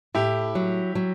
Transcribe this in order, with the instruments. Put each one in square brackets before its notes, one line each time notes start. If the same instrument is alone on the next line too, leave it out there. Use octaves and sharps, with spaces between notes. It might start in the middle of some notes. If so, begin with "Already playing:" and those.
[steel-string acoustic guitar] A2 [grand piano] E4 G4
[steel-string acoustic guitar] F#3
F#3